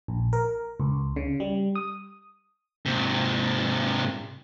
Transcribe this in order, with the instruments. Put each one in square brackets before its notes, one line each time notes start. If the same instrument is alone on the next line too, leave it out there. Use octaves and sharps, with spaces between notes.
[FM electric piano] A#1
A#4
C#2
C#3
G3
D#6
[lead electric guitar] G#2 C3